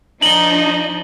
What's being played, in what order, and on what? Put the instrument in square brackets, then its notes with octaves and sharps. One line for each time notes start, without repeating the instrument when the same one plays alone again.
[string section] F3 D4 D#4 [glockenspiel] F#7 G7